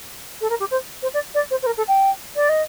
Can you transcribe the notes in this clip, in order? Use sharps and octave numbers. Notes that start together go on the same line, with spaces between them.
A4
A#4
G4
C5
C5
D5
D5
C5
C5
A#4
A4
G5
D5
D#5